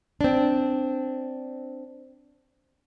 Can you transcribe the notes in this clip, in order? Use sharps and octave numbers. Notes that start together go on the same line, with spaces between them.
C4 D4